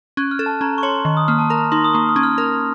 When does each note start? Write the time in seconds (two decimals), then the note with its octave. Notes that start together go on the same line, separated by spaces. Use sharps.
0.17 C#4 F#6
0.31 F6
0.39 A4
0.46 A5
0.61 C#4 A#5
0.78 C#6
0.83 C#5 C6
1.05 D#3 C#6
1.17 D#6
1.28 A#3 F6
1.39 A5
1.50 A#4 A#5
1.72 D#4 C6
1.84 D#6
1.93 A#3 C#6
2.09 D#6
2.16 C#4
2.23 F6
2.38 A#4 F6